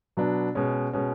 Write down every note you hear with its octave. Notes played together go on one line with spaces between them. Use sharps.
B2 F#3 B3 D4
B2 G#3 C#4
B2 G#3 C#4